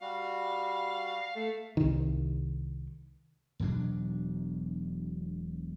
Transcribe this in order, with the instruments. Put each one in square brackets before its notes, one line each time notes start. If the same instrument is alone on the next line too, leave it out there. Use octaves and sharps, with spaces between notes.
[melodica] G3 F#4 [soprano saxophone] F5
[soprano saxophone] A3
[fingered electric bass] C2 D#3
[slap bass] E1 B2 F#3 D4